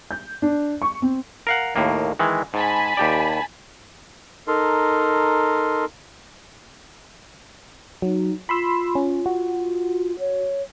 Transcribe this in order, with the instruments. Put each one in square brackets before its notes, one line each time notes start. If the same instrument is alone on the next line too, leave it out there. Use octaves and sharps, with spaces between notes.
[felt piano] G6
D4
C#6
C4
[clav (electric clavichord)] A#4 F5 F#5
D#2 A2 A#3
D#3 E3 G#3
[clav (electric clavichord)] G#2 [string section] G#5 A5 B5
[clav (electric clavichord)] D#2 G4 D5
[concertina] D#4 A4 A#4 C6
[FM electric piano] F#3 [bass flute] D#4
[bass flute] F4 [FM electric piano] B5 C6 E6
[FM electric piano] C#4
F#4
[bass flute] C#5